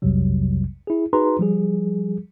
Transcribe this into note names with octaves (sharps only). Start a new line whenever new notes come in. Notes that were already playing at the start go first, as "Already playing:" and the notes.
B1 F2 C3 F#3 G3
E4 G#4
D#4 F#4 G#4 B4 A#5 C6
F3 G3 G#4